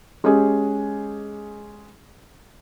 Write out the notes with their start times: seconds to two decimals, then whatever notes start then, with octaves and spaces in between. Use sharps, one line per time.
0.24 G#3 C#4 G4 G#4